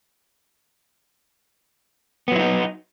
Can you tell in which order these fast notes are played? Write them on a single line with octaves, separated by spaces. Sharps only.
B3 F#3 E4 D#4